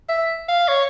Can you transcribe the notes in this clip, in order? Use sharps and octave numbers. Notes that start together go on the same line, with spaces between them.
E5
F5
C#5